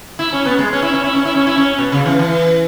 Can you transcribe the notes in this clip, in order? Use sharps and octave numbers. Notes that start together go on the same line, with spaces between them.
E4
C#4
B3
G#3
C#4
E4
C#4
E4
C#4
E4
C#4
E4
C#4
B2
C#3
E3
E3